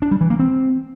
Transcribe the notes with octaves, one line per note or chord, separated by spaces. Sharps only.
D4
G3
E3
A#3
C4